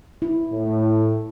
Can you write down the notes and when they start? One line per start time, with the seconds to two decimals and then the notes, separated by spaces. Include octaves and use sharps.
0.22 E4
0.51 A2